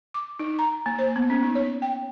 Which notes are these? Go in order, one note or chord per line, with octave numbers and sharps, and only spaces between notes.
D6
D#4
A#5
A#3
C5
B3
C#4
D#4
C#5
G5